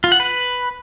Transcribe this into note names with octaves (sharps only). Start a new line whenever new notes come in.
F4
F#5
B4